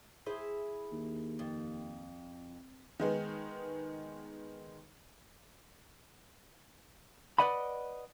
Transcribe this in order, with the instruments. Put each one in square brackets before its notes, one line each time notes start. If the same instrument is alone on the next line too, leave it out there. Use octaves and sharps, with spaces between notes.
[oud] E4 G#4 C5
[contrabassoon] D#2
[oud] F2
[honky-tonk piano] D#3 G#3 B3
[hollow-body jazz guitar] B4 C5 D5 D#5 F#5 B5